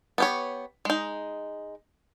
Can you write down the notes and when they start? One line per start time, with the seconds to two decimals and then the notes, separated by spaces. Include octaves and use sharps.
0.18 B3 G4 C#5
0.85 G#3 D#4